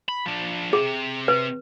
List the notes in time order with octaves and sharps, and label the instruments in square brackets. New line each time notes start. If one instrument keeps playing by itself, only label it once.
[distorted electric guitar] B5
F3 D4
[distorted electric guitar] C3 [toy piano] G#4
[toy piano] B4